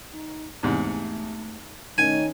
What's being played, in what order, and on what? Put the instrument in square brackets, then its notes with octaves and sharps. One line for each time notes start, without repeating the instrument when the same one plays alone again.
[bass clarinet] D#4
[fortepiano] E2 G#2 C3 [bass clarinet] A3
[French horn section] D#3 C#4 D#4 [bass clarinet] A3 [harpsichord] G#5